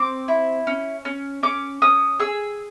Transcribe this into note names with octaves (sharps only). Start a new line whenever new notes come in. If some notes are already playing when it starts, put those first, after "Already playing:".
Already playing: C4 D6
E4
C#4
C#4
C#4 D6
C#4 D#6
G#4 E6